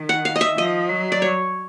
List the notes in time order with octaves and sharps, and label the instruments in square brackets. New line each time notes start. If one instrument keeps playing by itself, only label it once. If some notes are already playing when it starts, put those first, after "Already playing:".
Already playing: [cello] D#3
[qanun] F#5
F5
D#5
E5
[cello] F3 [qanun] D#5
[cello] F#3
[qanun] D5
C#5